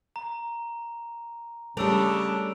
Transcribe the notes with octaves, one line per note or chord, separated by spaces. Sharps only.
A#5
C#3 G3 A3 D4 E6 D7 F7